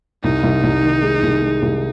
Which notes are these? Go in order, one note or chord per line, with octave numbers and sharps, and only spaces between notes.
C2 D#4
C2
C2
D#3
G#3
C2
G#3
C2